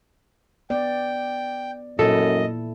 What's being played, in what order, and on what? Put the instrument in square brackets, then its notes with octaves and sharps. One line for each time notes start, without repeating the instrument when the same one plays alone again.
[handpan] B3 D5 [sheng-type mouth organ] G5
[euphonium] F#2 [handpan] A#2 E4 [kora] A4 [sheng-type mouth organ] D#5